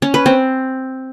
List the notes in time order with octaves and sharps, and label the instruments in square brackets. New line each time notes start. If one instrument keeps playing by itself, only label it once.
[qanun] C#4
B4
C4